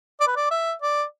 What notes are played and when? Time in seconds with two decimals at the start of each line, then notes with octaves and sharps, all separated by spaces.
0.20 D5
0.27 B4
0.36 D5
0.51 E5
0.82 D5